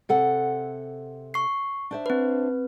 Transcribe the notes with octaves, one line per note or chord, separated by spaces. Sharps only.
C3 A4 F#5
C#6 C7
D4 C5 E5
C4 B4